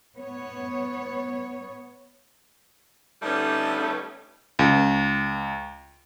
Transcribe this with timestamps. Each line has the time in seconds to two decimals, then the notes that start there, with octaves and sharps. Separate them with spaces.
0.17 B3 C#5
3.22 D3 G3 A3 B3 C#4 D#4
4.59 C#2